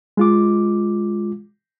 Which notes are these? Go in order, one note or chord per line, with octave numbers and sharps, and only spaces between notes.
G#3 F4 D6